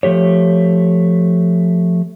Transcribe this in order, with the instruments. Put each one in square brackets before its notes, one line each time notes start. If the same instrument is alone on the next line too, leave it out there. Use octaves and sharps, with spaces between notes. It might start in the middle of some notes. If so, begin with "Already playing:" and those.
[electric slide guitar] F3 A3 G4 C#5